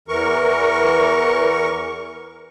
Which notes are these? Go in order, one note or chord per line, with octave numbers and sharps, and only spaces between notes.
E2 E3 A#4 C#6